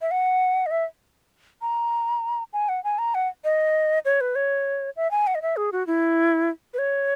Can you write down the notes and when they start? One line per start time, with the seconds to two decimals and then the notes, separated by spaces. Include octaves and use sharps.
0.01 E5
0.11 F#5
0.66 D#5
0.71 E5
1.62 A#5
2.53 G#5
2.69 F#5
2.84 G#5
2.99 A#5
3.15 F#5
3.44 D#5
4.05 C#5
4.21 B4
4.35 C#5
4.96 E5
5.11 G#5
5.27 F#5
5.35 D#5
5.42 E5
5.57 G#4
5.72 F#4
5.87 E4
6.74 B4
6.79 C#5